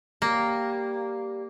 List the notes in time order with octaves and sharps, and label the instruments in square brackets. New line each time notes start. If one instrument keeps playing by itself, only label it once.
[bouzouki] G3 [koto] A#3